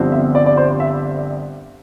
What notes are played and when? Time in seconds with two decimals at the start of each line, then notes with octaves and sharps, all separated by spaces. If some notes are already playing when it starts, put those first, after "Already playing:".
Already playing: G1 G2 D3 F3 C4
0.12 E5
0.35 D5
0.46 D5
0.57 C5
0.80 E5